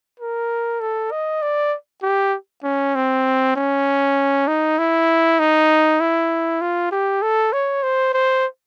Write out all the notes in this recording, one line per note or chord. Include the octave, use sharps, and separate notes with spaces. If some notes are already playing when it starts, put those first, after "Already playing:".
A#4
A4
D#5
D5
G4
C#4
C4
C#4
D#4
E4
D#4
E4
F4
G4
A4
C#5
C5
C5